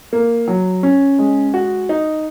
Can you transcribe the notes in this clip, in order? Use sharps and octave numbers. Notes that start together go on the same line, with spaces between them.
A#3
F#3
C#4
G#3
F#4
D#4